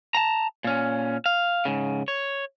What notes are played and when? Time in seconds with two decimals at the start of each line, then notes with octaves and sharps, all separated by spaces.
0.15 A5 A#5
0.64 A#2 C#4
1.26 F5
1.65 G#2 C#3
2.08 C#5